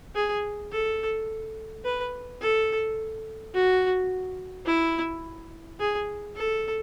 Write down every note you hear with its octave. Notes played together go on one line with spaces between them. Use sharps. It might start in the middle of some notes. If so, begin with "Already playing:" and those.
G#4
A4
B4
A4
F#4
E4
G#4
A4